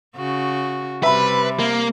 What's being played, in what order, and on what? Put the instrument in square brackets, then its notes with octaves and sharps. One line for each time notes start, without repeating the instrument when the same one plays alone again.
[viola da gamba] C#3 F#4
[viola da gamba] C3 G3 [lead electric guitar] B4 [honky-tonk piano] E5 B5
[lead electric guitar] A#3